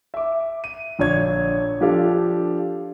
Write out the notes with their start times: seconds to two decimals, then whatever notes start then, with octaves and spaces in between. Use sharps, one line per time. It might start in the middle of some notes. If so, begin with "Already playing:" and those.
0.14 E5 D6
0.64 D#7
0.99 A#1 D3 C#5 G#6
1.81 F3 D4 G4 A4 F5